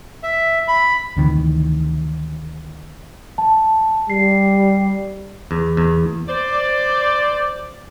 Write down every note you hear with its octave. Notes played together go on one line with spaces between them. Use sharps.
E5
B5
D2 C3 D#3 E3
A5
G3 C7
E2
E2
C5 D5